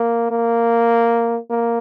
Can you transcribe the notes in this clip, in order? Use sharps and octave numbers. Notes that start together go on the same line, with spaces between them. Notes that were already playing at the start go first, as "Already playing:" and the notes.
Already playing: A#3
A#3
A#3